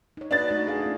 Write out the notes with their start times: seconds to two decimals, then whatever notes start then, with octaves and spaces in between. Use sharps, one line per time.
0.17 D#4 C#5
0.31 D4 F#4 B4 D#5 A6
0.50 A3 D#4 F#4
0.67 G#4 F5
0.83 C#4 F4